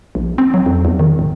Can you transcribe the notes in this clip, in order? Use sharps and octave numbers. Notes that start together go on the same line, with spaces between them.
A#1
C4
F#3
F2
E2
D#3
D1